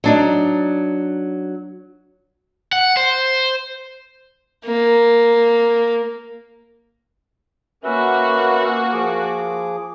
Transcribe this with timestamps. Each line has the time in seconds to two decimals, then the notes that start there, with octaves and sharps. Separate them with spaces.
0.04 F#3 D4 D#4
2.73 F#5
2.97 C5
4.65 A#3
7.84 A#3 C#4 F#4 B4 E5
8.93 F3 G#4 D6